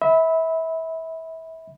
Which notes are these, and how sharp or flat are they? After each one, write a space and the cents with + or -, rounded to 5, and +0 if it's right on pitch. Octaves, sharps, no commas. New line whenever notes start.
E5 -30 B5 +0